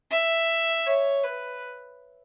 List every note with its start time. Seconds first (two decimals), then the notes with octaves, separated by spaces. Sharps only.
0.11 E5
0.87 C#5
1.23 B4